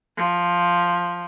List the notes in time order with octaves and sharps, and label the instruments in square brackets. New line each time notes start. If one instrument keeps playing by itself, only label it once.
[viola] F3